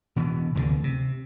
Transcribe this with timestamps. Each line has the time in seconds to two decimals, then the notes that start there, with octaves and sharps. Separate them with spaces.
0.16 B2 E3 B3
0.55 F1 D2 A2 D3
0.84 C3